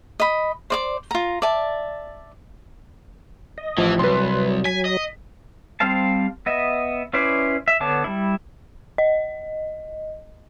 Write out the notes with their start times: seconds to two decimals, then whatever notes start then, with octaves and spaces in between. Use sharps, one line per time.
0.20 D#5 B5
0.70 C5 D5 D6
1.11 F4 A#5
1.42 D5 E5 A5
3.58 D#5
3.78 A1 E3 F3
3.99 C2 F#3 B4 C6
4.65 G#5 B6
4.85 D#5
5.80 G3 C4 C5 F5 A5
6.46 B3 D#5 E5
7.13 C#4 E4 B4 C5 D5
7.68 E5
7.80 D3 B3 C#5 A5 D6
8.04 G3 E4
8.98 D#5